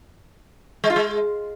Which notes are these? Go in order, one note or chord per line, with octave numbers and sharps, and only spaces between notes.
G#3
F4
G#3